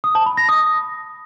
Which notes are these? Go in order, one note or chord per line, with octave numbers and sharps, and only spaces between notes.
D#6
A5
B5
A#6
D#6